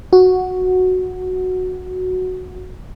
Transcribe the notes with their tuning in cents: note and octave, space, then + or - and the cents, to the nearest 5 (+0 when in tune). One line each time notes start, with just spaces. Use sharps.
F#4 -5